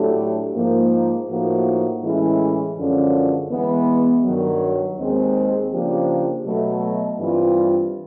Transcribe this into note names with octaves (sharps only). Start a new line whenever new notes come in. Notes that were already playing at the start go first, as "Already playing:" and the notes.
Already playing: A2 F#3 A3 D4 G4
G#2 F3 A#3
A2 F3 A#3 D#4 F#4
A2 E3 G#3 C#4 E4
F#2 D3 F3 G#3 C#4
E3 G#3 B3
G2 D#3 F#3
D#2 D#3 G#3 C4
C#3 F3 A#3 D4 G4
B2 F#3 A3
G2 E3 G3 C4 F4